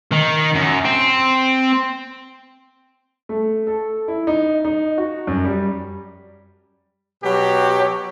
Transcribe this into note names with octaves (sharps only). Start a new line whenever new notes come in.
D#3
F#2
C4
A3
A4
E4
D#4
D#4
F#4
F#2
G3
B2 F#3 G4